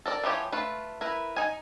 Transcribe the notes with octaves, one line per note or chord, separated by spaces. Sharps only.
A4 A#4 D5
E3 F3 G4 C#5
A3 F4 B4
E4 A#4 B4
D#4 G#5